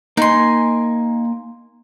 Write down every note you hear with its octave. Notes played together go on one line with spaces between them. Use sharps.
A#3 D#4 G#5 C6